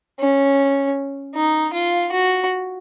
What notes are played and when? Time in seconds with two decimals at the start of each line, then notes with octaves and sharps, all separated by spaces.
0.20 C#4
1.35 D#4
1.74 F4
2.12 F#4